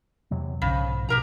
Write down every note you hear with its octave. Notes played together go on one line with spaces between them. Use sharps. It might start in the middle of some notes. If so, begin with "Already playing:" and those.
E2 C3 F#3
B1 G#2 C#3 F3
B2 G4 A#4 A#5